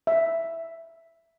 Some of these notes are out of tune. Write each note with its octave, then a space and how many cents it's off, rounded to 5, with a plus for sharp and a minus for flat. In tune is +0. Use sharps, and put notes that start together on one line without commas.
E5 +5